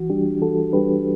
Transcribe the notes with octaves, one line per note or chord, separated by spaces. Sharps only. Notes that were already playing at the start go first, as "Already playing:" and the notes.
Already playing: E3 F#4
G3 D4 G4
E3 F#4 A4
G3 D4 G4 B4